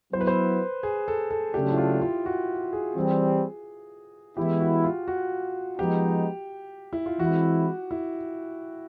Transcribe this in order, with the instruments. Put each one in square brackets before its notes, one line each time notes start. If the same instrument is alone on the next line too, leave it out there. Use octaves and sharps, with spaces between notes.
[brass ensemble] F#3 B3 E4 [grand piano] C5
[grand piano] B4
C5
G#4
A4
A4
[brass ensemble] C#3 F#3 A3 D4 [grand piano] G4
[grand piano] E4
F4
F4
F#4
G#4
[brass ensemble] E3 G3 C4
[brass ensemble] E3 G#3 B3 E4 [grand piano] G4
[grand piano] F#4
F4
F#4
[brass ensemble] F3 G#3 B3 D#4 [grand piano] G4
[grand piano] E4
F4
[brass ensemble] E3 G#3 C4 E4 [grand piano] F#4
[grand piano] E4